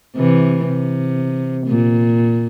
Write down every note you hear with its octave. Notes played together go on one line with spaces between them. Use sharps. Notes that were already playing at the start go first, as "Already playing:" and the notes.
C3 E3
C3
A#2